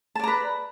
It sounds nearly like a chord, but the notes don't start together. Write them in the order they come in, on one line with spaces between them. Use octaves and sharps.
A5 D5 A#5 B4